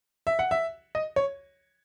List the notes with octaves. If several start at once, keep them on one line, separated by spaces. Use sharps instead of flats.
E5
F#5
E5
D#5
C#5